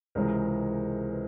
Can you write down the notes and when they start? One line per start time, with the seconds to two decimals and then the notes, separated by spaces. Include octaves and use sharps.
0.15 C#2 C3 E3 G#3 C4 A#4
1.12 B4